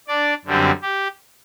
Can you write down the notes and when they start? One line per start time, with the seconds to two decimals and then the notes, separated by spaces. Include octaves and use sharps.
0.08 D4 D5
0.45 F#2 D3 G3 C4
0.82 G4